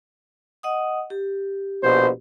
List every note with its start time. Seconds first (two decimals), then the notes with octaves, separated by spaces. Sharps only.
0.63 D#5 F#5 D#6
1.10 G4
1.82 A#1 B2 C5